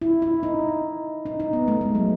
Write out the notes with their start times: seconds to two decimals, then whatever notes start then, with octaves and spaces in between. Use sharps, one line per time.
0.02 E4
0.22 E4
0.43 D#4
1.26 D#4
1.40 D#4
1.53 B3
1.68 A3
1.81 G#3
1.95 F#3